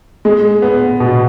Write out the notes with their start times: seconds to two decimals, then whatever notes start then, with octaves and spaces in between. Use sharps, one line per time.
0.25 G#3
0.62 B3
1.00 B2